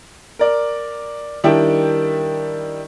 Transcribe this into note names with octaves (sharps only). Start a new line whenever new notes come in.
A#4 D5
D#3 G3 D4 E4 G5